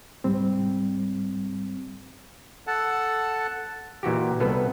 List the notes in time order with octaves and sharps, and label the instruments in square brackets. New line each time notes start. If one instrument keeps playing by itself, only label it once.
[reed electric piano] C2 G#2 G3 C4
[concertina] A4 F#5 A5
[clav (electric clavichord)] A#2 E3 F#4 G4
C2 B3 A4 B4